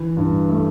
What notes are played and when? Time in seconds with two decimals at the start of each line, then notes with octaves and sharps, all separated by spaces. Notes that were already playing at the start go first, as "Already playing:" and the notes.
Already playing: E3
0.17 G2
0.49 A3